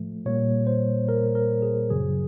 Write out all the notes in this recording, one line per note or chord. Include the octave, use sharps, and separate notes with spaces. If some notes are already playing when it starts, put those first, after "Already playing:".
Already playing: A2 F3 A3
A#2 G3 A#3 C#5
C5
A#4
A#4
G#4
F#2 C#3 F#3 G#4